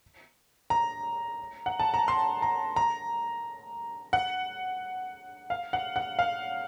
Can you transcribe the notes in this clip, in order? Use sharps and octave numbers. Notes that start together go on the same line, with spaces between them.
A#5
F#5
A5
A#5
C6
A#5
A#5
F#5
F5
F#5
F#5
F5